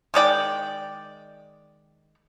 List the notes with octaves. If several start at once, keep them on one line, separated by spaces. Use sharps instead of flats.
D#3 G#3 D5 G5